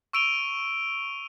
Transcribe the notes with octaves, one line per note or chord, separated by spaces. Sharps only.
C#6 E6 D7 D#7 F7 G7